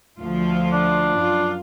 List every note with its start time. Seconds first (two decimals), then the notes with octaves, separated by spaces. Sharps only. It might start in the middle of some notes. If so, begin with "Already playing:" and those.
0.21 D2 F3 F4
0.73 D4
1.19 F#2 F4